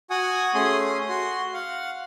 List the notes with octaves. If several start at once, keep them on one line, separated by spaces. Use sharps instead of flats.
F#4 F#5 G#5 D#6
A3 C#4 G#4 C6 D#6
F#4 C6
F5 F#5